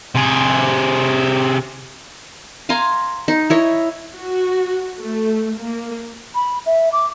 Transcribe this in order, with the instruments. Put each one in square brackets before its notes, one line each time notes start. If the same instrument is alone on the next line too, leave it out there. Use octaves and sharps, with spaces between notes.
[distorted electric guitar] C3 G#4
[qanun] F5 G#5 A#5 C6
D#4
E4 C#5 D#5
[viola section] F#4
A3
A#3
[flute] B5
E5
D6